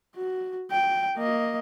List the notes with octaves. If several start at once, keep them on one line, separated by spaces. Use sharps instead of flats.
F#4
G5
A#3 D#5